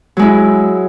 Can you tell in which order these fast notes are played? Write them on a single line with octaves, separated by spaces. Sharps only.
F#3 G#3 E4